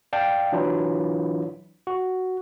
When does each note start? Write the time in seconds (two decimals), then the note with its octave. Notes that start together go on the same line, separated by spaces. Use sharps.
0.13 D5 F5 G5 A5
0.52 E3 F#3 D4 E4 F4
1.87 F#4